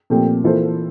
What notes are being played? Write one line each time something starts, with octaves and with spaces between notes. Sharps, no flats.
A#2 F3 A3 C4 G4
E3 A#3 F4 A4 C5